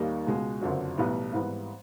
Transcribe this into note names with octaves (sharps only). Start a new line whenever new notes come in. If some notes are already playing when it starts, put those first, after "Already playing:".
Already playing: D#2 D#3 G3 A#3 D#4
C#2 B2 G#3
F#1 F2 D3 F#3
B1 A2 E3 G3 B3
G#1 G#2 E3 G3 B3